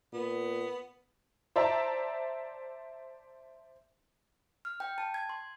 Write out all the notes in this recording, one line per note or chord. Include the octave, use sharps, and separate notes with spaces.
A#2 B3
C5 D5 E5 A5 A#5
F6
G5
A5
G#6
C6